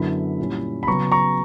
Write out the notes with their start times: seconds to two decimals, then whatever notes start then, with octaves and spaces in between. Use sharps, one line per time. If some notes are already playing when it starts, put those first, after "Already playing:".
Already playing: F#2 D3 F#3 B3 E4 B5
0.39 A#2 G3 C#4 E4
0.83 B5
0.87 C#3 F#3 B3 A#5 C#6
1.12 A#5 C#6